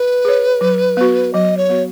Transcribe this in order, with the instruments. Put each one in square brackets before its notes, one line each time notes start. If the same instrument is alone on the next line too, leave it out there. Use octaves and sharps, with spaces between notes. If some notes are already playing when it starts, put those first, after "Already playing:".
Already playing: [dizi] B4
[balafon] G#4 C#5
F#3
B3 F#4
[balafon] F#3 [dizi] D#5
[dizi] C#5
[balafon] B3 F#4